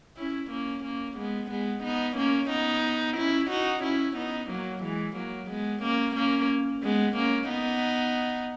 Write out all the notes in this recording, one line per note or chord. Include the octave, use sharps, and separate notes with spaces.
C#4 E4
A#3 C#4
A#3 C#4
G#3 B3
G#3 B3
B3 D#4
A#3 C#4
B3 D#4
C#4 E4
D#4 F#4
C#4 E4
B3 D#4
F#3 A#3
E3 G#3
F#3 A#3
G#3 B3
A#3 C#4
A#3 C#4
G#3 B3
A#3 C#4
B3 D#4